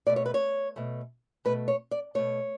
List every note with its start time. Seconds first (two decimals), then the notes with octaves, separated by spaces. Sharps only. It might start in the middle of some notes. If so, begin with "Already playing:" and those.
0.07 B2 A3 D5
0.16 C#5
0.26 B4
0.34 C#5
0.76 B2 A3
1.45 B2 A3 B4
1.68 C#5
1.91 D5
2.15 B2 A3 C#5